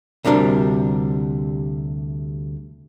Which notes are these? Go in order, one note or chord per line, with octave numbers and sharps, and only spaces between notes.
D2 C3 G3 D4 A#4